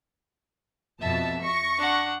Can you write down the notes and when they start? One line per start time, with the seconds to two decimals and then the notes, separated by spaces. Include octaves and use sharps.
1.01 F2 B2 E5 A5
1.42 C#6 A#6
1.78 D4 F#5